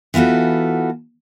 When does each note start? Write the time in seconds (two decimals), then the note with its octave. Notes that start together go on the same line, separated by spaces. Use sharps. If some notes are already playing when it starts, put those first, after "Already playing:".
0.14 E3 B3 F4 F#4 A4